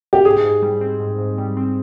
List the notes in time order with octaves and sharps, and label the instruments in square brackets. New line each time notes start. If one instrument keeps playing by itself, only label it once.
[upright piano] G4
[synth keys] G#2 [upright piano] G#4
[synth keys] G#2
G3
C4
G#2
G#2
G3
C4